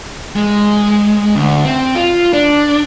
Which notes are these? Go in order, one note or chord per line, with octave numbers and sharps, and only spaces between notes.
G#3
D2
C4
F4
D4